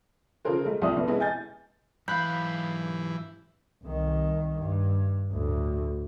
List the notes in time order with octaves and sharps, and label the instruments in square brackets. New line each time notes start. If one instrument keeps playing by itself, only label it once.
[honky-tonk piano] C#3 F4 A4 A#4 C5
G#3 A3
C2 F3 D5 E5 D#6
F1 C2 B3
G#3 B3 E4
D#5 G#5 G6 A6
[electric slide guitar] G#2 F#3 F5 [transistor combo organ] E3 [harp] B5 F#6 [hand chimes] G6
[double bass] C2 D#3
G2
D2 A2